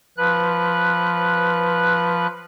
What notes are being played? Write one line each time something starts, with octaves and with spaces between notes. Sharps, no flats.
F3 B4 F#6